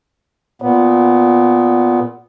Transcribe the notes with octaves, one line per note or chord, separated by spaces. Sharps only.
A#2 B3